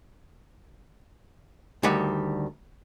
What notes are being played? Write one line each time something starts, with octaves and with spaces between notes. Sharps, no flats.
D2 D#3 G3 F#5